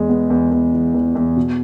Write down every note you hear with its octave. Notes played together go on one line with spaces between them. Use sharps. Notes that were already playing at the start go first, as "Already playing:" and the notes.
Already playing: E2 G#3
B3
E2
E2
E3
E2
E2
B2